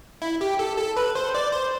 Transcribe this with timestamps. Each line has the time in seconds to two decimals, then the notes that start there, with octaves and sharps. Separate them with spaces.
0.22 E4
0.41 G4
0.59 A4
0.78 A4
0.97 B4
1.15 C5
1.35 D5
1.52 C5